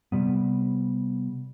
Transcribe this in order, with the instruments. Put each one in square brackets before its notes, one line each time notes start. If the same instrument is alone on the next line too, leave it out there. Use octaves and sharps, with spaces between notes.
[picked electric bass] C3 G3 B3